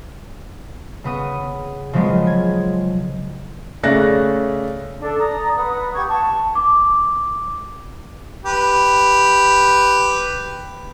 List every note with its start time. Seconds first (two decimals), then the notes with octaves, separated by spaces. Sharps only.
1.04 C#3 B3 D#6
1.93 C#3 F3 F#3 G#3 B3
2.27 G#6
3.83 C#3 A3 D5 F#6 A6 A#6
5.00 D4 A4
5.18 D5 A#5 D#6
5.56 B4 F#5 D#6
5.94 G4 F#5 C#6 G#6
6.08 F#5 A5 C#6
6.55 D6
8.46 G4 B4